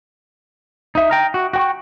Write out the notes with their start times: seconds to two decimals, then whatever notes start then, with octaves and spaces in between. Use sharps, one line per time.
0.95 D#4 E5
1.10 G5 A#5 F6
1.34 F#4
1.53 F#4 G5 C#6